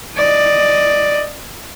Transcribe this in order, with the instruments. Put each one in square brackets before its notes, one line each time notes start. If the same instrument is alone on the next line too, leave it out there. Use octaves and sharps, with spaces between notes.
[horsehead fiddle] D5 D#5